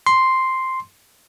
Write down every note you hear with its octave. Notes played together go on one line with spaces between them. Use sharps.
C6